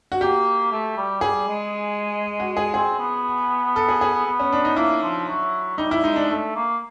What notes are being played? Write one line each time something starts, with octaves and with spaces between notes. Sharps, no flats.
F#4
A#3 G4
A3
G3
G3 G#4
G#3
F#4
G#4
C4 G#4
B3
A4
G#4
G#4
B3
C#4
D4
D#4
A#3 E4
F3
F#3
G3 D#4
E4
G#3 D#4
D4
A3
A#3